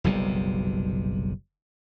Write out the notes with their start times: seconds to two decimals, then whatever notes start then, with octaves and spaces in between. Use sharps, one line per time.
0.04 F#1 B1 C3 G3